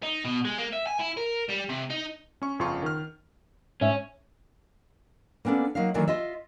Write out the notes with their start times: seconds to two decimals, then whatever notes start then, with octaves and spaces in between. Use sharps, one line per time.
0.03 D#4
0.25 B2
0.45 G#3
0.58 A#3
0.73 E5
0.87 G#5
1.00 E4
1.17 A#4
1.49 G3
1.69 C3
1.90 D#4
2.42 C#4 C#6
2.59 G1 F2 C#3 F4 C6 C#6
2.83 D#3 F6
3.81 G#2 C#4 E5
5.45 A#3 B3 C#4 D4 A4
5.75 F#3 A#3 D#4 F5
5.94 D#3 E3 F#3 A3 A#3 D4
6.08 F4 D#5 E5